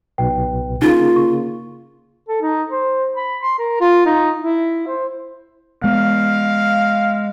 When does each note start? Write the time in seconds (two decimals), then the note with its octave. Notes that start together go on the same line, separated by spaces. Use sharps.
0.18 B1 B2 B4 G5
0.82 C#3 A#3 D#4 F4
1.16 C#6
2.28 A4
2.42 D#4
2.69 C5
3.17 B5
3.42 C6
3.59 A#4
3.80 F4
4.06 D#4
4.40 E4
4.87 C5
5.84 G#3 B3 F5